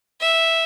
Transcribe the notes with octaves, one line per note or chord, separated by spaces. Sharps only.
E5